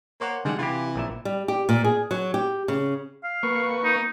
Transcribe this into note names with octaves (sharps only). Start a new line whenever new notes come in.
A#3 C5 C#5 F#5
D3 D#3 G3 G#3 E4 F#5
C3 E3 F4 G4
A#1 A#2 E5
G3
G4
A#2
G#4
F#3
G4
C#3
F5
A#3 B4 C#6
D#4